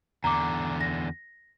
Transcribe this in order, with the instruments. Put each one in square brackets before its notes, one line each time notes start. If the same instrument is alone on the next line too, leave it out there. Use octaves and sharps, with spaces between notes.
[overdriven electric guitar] E2 D3 [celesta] A#5 D6
[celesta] A#6